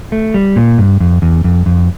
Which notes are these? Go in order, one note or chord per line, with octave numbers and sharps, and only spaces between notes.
A3
G3
A#2
G2
F2
E2
F2
F2